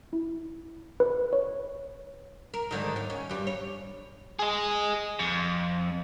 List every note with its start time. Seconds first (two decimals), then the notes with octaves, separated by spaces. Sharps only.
0.13 E4
1.00 B4
1.33 C#5
2.54 A#4
2.71 G#2 D3 D#3
2.96 D#2
3.10 C#4
3.29 G2 G3
3.47 C#5
4.39 G#4 D#5
5.19 F2